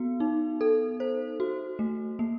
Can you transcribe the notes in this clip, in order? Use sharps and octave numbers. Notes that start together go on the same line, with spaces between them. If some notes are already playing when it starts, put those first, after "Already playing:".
Already playing: B3 F#4
D#4
A4
C5
F#4
A3
A#3